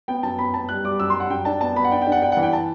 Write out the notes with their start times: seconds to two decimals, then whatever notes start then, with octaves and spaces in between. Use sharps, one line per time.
0.08 B3 G5
0.23 F#2 A5
0.39 B3 B5
0.54 B3 A5
0.69 G3 F#6
0.85 G3 D6
1.00 F#2 E6
1.10 G3 C6
1.20 F#5
1.30 F#2 G5
1.45 D4 A5
1.61 B3 A5
1.76 B3 B5
1.84 F#5
1.91 D4 G5
2.02 G5
2.07 D4
2.12 F#5
2.22 D4 G5
2.32 E3 F#5
2.43 G5
2.53 A5